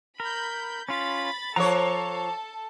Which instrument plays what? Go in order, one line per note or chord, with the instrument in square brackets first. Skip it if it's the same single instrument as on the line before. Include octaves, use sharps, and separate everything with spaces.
[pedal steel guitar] A#4 [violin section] B5 G6
[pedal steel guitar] C#4 F4 [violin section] B5 A6
[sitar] F3 C#5 [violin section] A4 A5 [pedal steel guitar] A#5 D6